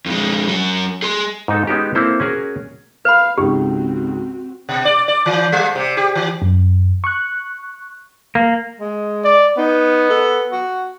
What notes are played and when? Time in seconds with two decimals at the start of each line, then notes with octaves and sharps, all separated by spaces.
0.06 F2 G#3
0.49 F#3 C#4
1.02 G#4 C6
1.48 G#2 D#4 A4
1.67 G#3 B3 C#4 D#4 F#4 G4
1.95 A#3 C4 E4 A4 C5
2.20 C#4 F#4 G#4 A#4
3.05 B4 F5 B5
3.38 C#2 G#2 C4 F#4 G4
4.69 B2
4.85 D5
5.08 D5
5.26 E3
5.52 G3
5.75 C3
5.97 G4
6.15 E3
6.42 F#2
7.04 C#6 F#6
8.35 A#3
8.80 G#3
9.24 D5
9.58 B3 D#4
10.10 A4
10.52 F#4